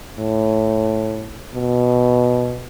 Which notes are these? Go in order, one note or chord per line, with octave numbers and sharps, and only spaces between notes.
A2
B2